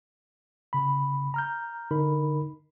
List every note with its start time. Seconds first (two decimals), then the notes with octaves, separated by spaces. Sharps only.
0.73 C#3 B5
1.34 A#5 F6 G6
1.91 D3 D#4 A#4 B5